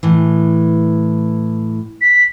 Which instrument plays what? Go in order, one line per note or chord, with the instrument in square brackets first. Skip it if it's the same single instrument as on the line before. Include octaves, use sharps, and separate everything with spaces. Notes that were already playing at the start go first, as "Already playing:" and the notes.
[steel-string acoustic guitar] A2 E3
[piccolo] B6